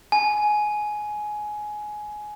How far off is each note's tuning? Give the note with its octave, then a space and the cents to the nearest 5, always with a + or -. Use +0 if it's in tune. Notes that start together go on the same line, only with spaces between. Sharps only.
G#5 +15